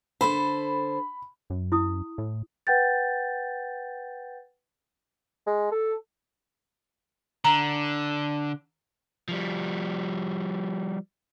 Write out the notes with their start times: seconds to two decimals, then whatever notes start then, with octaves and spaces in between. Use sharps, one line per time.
0.21 D3 A4 C5 B5
1.50 F#2
1.72 E4 D#6
2.18 A2
2.67 B4 F#5 G5 G6 A6
5.47 G#3
5.71 A4
7.45 D3 A#5
9.28 F3 G3